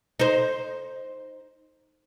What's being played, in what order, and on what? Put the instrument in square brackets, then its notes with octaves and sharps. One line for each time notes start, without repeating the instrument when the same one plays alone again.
[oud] D#4 C5